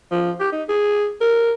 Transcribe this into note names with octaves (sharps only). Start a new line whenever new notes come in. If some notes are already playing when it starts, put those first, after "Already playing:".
F3
G4
D#4
G#4
A#4